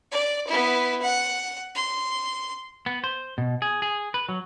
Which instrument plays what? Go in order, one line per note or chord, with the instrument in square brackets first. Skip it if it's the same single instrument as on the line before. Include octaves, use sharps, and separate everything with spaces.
[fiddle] D5
B3 E4
F#5
C6
[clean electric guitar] B3
C5
B2
G#4
G#4
B4
F#3